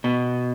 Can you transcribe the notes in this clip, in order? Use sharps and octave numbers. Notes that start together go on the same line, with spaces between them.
B2